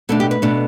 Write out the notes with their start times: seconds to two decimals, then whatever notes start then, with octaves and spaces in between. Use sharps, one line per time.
0.09 B2 A3 D4 A4
0.20 G4
0.31 B4
0.42 B2 A3 D4